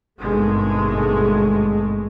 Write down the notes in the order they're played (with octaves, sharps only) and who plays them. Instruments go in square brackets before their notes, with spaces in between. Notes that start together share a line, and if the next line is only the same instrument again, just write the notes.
[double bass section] G#1 G2 B2 G#3 A3